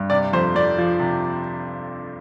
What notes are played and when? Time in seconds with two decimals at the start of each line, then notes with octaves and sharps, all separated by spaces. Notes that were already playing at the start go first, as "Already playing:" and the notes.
Already playing: G2
0.10 C3 D5
0.33 F2 C5
0.55 F2 D5
0.78 F3
1.00 C3